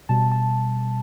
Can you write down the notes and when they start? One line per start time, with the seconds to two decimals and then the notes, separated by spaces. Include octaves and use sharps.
0.09 B2 G3 A5
0.32 A5